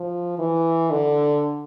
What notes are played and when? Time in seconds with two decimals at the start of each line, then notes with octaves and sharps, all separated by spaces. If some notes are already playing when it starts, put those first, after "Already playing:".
Already playing: F3
0.39 E3
0.91 D3